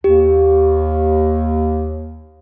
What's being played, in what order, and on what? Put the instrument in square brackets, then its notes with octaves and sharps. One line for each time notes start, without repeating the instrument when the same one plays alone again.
[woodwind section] D#2 [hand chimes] G4